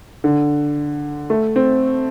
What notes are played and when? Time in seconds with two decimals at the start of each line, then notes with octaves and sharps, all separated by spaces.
0.24 D3
1.30 A3
1.56 C4